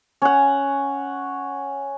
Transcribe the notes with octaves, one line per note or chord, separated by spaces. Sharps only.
C#4 F#5